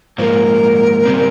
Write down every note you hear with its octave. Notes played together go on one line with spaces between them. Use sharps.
G#2 F3 A#3 A#4 C5
C#3 G3 C4